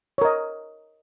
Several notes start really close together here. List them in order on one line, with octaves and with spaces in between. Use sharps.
C#5 A#4 D#5